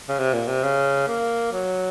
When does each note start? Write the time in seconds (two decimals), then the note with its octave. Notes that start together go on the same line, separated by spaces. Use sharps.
0.09 C#3
0.18 C3
0.33 A#2
0.48 C3
0.63 C#3
1.08 A#3
1.52 F#3